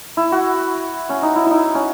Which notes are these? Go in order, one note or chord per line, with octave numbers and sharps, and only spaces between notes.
E4
F#4
C#4
D#4
E4
D#4 E4
C#4